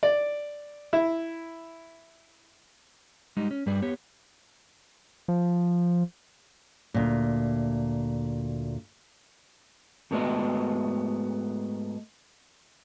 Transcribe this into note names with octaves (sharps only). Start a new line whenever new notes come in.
D5
E4
G3 G#3 D#4
C#4
G2 G3 G#4 D5
B3 G4 C#5
F3
D2 A#2
G#2 A3 B3 F#4 C5 D#5